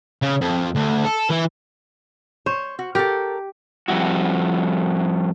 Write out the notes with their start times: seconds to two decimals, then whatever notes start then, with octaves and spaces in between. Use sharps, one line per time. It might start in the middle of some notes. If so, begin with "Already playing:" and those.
0.22 C#3
0.41 F2
0.75 D2
1.04 A4
1.30 E3 E4
2.46 C5 C#5
2.79 F#4
2.95 G4 A4 A#4
3.88 F2 B2 G3 E4 F#4